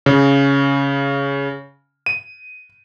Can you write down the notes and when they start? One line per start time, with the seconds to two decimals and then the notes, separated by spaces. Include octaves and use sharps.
0.06 C#3
2.06 D#7